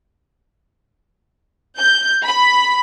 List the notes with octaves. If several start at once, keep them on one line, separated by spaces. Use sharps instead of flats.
G6
B5